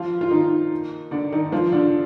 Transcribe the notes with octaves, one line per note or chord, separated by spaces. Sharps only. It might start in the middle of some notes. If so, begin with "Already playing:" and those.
Already playing: F3 F4
F4
D#3 D#4
D3 D4
D#3 D#4
F3 F4
D3 D4